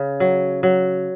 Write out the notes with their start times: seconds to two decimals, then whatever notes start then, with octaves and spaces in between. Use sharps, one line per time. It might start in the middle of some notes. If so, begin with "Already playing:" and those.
Already playing: C#3
0.20 F#3
0.63 F#3